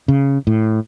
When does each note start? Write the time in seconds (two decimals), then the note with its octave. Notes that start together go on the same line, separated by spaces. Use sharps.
0.08 C#3
0.47 A2